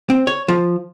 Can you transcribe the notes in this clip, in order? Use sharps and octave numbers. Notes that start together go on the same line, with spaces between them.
C4
C#5
F3